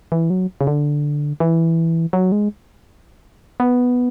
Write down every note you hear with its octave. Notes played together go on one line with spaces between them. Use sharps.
E3
F#3
C#3
D3
E3
F#3
G#3
B3